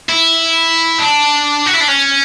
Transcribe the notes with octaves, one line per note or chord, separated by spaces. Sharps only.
E4
D4
F#4
E4
D4
C#4